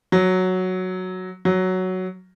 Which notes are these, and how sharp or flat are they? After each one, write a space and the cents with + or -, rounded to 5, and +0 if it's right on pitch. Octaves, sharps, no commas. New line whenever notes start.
F#3 +0
F#3 +5